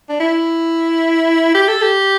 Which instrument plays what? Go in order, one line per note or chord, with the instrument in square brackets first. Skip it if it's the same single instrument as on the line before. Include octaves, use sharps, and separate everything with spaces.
[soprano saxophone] D4
E4
G4
A4
G4